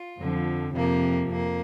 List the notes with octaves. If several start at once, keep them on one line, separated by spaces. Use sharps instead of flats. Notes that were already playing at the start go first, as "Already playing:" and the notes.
Already playing: F4
F2 D3 F3
F2 C3 F3 A#3
F2 A#3